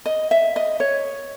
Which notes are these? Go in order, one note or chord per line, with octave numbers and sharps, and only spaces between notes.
D#5
E5
D#5
C#5